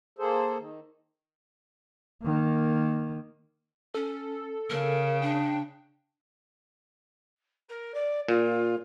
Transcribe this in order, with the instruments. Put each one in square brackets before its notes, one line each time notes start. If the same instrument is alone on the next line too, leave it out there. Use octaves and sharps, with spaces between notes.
[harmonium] A#3 G#4 A4 C5
D#3
[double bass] D#3 A#3
[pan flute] C#4 [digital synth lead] A4
[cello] C#3 [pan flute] A#4
[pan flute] D4 [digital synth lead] G5
[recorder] A#4
D5
[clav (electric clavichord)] A#2 [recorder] F4